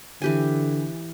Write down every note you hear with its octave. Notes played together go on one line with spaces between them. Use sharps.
D3 E3 G4 G#5